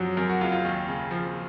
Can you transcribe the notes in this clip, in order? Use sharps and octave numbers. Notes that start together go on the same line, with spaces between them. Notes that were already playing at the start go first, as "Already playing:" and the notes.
Already playing: F#2 F3 F#3
F#2 A#4
F#4
F#1 F4
F4
D#2
C#3
F3